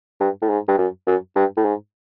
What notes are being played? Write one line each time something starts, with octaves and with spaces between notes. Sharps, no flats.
G2
A2
G#2
G2
F#2
F#2
G2
A2
G#2